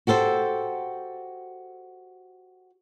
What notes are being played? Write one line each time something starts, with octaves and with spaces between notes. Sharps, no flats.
F#4 G4 A4 C5